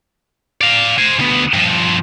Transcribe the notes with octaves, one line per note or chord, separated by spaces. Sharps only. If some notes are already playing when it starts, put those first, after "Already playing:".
D5 F5
C5 G#5
D2 B3
G2 F3